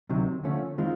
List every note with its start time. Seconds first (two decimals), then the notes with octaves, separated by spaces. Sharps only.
0.09 D2 C3 D#3 F#3
0.43 D3 F3 A3 C#4
0.78 D#3 G#3 C4 F4